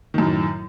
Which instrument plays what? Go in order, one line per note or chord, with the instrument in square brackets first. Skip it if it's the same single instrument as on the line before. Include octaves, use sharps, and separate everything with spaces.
[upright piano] D#3
F#2
A2